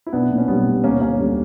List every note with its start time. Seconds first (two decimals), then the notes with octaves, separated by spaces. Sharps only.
0.06 E4
0.13 B1 B3 D4
0.31 A#2
0.38 C#4
0.48 B1 G3 B3
0.66 A#2
0.84 D2 A#3 C#4
1.01 D3 A#3 C#4
1.18 D2 G3